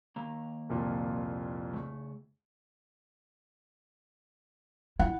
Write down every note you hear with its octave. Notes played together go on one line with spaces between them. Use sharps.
D#3 A#3 A#5
C2 F2 A#2
C#3 A3
E4 F#5